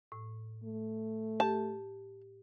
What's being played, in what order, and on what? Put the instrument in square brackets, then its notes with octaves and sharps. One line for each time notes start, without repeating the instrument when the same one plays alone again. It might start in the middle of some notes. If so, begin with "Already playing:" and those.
[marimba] A2
[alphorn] A3
[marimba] G4 [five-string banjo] A5